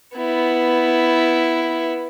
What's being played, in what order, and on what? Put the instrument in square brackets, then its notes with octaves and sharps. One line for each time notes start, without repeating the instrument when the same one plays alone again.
[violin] B3 E4